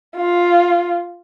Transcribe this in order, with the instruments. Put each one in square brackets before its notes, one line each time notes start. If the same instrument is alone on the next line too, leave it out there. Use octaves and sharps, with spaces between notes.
[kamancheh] F4